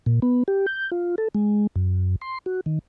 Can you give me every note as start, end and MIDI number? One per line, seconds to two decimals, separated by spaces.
0.06 0.20 46
0.22 0.43 59
0.48 0.66 67
0.67 0.90 91
0.92 1.15 65
1.18 1.28 69
1.35 1.67 56
1.76 2.16 42
2.21 2.38 84
2.46 2.61 66
2.66 2.79 51